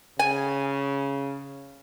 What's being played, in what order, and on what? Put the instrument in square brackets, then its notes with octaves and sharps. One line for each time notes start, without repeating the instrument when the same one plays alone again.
[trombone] C#3 [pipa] G#5